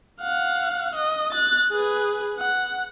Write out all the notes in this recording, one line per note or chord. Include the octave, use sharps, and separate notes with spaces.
F5 F#5
D#5
F#6 A6
G#4 B4
F#5